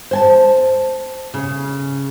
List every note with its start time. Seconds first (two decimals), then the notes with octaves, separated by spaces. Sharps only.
0.11 C5 G#5 A5
1.34 C#3